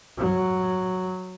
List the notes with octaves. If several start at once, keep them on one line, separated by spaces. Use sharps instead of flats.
F#3